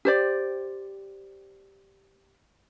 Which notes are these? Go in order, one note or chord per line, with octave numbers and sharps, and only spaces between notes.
G4 C5 D5